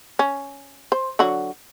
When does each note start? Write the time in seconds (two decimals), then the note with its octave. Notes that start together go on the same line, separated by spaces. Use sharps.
0.19 C#4
0.92 C5
1.19 D3 F#3 F#4